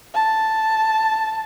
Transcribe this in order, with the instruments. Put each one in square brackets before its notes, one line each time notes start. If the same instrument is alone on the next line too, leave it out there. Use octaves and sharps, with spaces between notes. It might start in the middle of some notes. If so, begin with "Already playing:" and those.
[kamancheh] A5